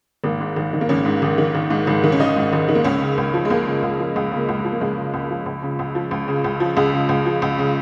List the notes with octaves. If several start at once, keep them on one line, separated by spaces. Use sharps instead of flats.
G#1 A#3
G#2
G#1
D#3
A#3
G#1 C#4
G#2
G#1
D#3
G#1
G#2
G#1
D#3
C#4
G#1 D#4
G#2
G#1
D#3
A#3
C#2 C#4
C#3
C#2
F3
G#3
C#2 A#3
C#3
C#2
F3
C#2 G#3
C#3
A#3
C#2
G#3
F3
A#3
C#2 G#3
C#3
C#2
F3
C#2
C#3
C#2
F3
C#2
C#3
C#2
F3
C#2 G#3
C#3
C#2
F3
C#2
C#3